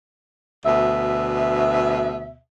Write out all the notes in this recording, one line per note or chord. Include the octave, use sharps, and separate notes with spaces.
D2 B2 E5